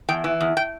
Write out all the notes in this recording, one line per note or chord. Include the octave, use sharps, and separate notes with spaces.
E2 G5
E3
E2
G5